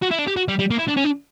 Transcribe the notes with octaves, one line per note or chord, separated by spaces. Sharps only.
F#4
E4
D4
G4
F#4
G3
G3
A#3
E4
D4
C#4
D4